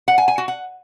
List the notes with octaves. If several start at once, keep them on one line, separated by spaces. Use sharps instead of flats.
F#5
G#5
G#5
F#4
F#5